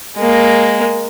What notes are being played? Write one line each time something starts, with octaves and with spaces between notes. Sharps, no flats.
G#3 A#3